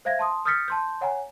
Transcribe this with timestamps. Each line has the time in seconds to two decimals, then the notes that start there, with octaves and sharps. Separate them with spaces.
0.05 C5 E5 F5 G#6 A#6
0.19 A5 C6 D#6
0.45 D#6 F6 G6 A6 B6 C#7
0.68 A5 C6 G6
1.01 C#5 F#5 G#5 A#5